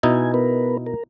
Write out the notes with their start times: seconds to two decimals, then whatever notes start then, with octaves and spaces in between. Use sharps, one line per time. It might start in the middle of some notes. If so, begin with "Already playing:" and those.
0.03 B2 D#4 E4 G#5
0.34 B3 A#4 B4
0.86 A#4